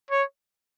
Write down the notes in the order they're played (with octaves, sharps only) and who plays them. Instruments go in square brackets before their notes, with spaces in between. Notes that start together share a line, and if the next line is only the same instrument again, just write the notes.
[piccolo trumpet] C#5